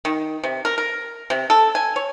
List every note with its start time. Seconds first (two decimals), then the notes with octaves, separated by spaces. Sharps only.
0.05 D#3
0.44 C3
0.65 A#4
0.78 A#4
1.30 C3
1.50 A4
1.75 G#5
1.96 C#5